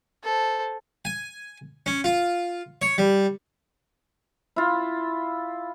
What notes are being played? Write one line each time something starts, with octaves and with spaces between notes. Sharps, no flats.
A4 C5
G#5
C#4
F4
C#5
G3
E4 F4